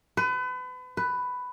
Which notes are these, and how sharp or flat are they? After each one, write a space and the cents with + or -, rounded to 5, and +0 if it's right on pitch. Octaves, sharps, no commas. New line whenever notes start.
B4 +35
B4 +10